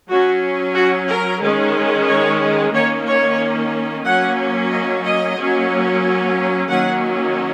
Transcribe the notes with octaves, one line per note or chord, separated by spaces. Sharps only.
F#3 C#4 F#4
F#4
A#4
D#3 G#3 C#4
C#5
D#3 A#3 C#4 C#5
C#5
F#3 A#3 C#4 F#5
D#5
D#5
F#3 A#3 C#4
D#3 F#3 A#3 C#4 F#5